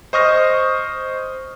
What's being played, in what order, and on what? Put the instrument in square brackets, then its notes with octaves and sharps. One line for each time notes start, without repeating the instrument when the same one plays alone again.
[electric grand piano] C5 D#5 C#6 D#6 F6 A#6